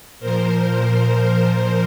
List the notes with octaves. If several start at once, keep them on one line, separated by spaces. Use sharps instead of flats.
A#2 F3 A#4 C5